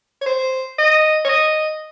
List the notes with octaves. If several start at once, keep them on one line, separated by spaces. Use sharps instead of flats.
C#5
C5
D#5
C#5
D#5